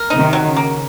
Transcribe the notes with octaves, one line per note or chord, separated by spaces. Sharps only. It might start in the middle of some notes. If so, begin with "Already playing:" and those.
Already playing: A#4
D#4
C3 D#3
F#3
C#3
A#3